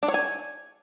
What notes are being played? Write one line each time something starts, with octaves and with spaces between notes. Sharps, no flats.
D4
C#5
G#5